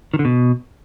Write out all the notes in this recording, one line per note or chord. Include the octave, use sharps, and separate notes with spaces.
D#3
D3
B2